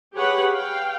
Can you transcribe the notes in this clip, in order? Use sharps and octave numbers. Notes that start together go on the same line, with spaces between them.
G4 G#4 B4 C#5 F#5
F5 G5